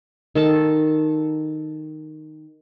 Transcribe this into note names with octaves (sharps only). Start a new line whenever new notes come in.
D#3 A4 A5